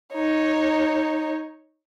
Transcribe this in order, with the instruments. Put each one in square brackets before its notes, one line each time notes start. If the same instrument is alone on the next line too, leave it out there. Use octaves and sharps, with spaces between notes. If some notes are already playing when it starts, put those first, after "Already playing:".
[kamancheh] D#4 C#5